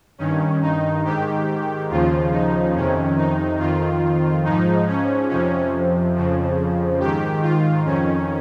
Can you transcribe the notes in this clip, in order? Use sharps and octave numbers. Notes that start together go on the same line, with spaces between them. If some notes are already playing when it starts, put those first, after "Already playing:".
G2 D#3 C#4
D#4
G#2 D#3 G4
D#2 C#3 F3 F4
D#4
F2 C3 D#3 C#4
D#4
F2 D#3 F4
G#2 F3 D#4
C#4
F2 C3 F3 C#4
F2 C#3 F3
G#2 D#3 G4
F4
F2 D#3 C#4